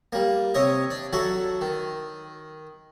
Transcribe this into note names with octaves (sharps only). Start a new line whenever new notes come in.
G3 A#3
C3 C#5 D#5 E5
D4
F#3 F#4 A4 E5
D#3